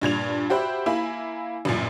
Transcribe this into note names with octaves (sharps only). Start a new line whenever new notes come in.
G2 A#2 G#6 F7
F#4 G4 C5 E5 B5
A#3 E4 G#5 B5
A1 F#2 A#2